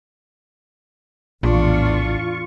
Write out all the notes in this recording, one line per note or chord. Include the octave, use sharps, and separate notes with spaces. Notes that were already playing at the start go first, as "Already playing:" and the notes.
A#1 E2 A2 D4 F4 C#6